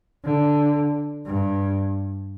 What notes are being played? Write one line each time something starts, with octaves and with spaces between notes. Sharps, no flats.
D3
G2